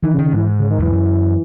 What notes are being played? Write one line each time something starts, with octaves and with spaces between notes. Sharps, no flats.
D#3 E3
C#3
D#3
C#3
G#2 E3
C#3
D#3
E2 E3
F#2